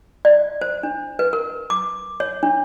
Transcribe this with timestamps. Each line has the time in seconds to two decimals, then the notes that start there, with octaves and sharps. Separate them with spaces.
0.25 D5
0.61 C5
0.83 D4
1.19 B4
1.33 A#4
1.70 D6
2.20 C#5
2.43 D4